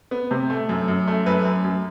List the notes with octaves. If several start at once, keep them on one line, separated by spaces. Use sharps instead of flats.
B3
C3
A3
F#2
F#2
A3
F#2 B4
F#2
F#2